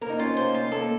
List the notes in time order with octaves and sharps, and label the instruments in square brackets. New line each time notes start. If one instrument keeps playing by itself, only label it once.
[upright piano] A#3 [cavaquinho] A#4
[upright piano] D#4
[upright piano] C#4 [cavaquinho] F4
[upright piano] C4
[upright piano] A#3 [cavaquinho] C5
[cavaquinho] F4
[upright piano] A#3 [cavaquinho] A4